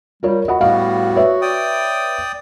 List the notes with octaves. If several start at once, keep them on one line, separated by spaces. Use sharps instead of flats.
G3 F4 A#4 C#5
F#4 D#5 F#5 B5
A2 G3 B3 F#4 F5
B4 C#5 E5
D5 G5 D#6